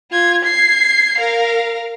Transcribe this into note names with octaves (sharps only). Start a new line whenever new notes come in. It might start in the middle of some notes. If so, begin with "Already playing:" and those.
F4 G#6
G#6 C7
A#4 F5